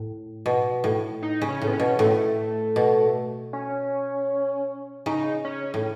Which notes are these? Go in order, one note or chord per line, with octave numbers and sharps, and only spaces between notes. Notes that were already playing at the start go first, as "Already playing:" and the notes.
Already playing: A2
B2
A2
D#4
C#3
C#4
A2
B3
C#4
B2
A2 A3
B2
C#4
C#3 D#4
C#4
A2